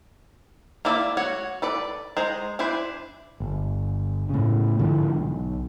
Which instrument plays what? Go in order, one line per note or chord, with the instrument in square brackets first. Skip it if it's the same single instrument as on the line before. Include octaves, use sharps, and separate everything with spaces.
[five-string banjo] A#3 E4 D5 E5
F#4 C#5 F#5
A4 B4 D5
G#3 C5 A#5
D4 E4 B4 C5
[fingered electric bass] G1
A2 C#3
G#2 D3 E3 F3
B1